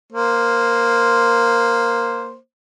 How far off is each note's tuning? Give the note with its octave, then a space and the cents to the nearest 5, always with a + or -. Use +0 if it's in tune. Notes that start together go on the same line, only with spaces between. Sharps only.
A#3 +0 C5 +0